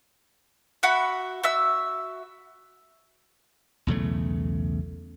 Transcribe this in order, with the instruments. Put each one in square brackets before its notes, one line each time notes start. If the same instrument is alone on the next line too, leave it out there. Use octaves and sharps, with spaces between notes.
[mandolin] F#4 E5 F#5 B5
F#4 E5 E6
[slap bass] B1 E2 C#3 A3